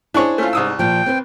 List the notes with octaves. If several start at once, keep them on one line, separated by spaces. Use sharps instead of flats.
D4 E4 G#4 C5 C#5
A3 C#4 F4
C2 G#2 D#6 E6
A#2 F3 G5
C4 B4 C5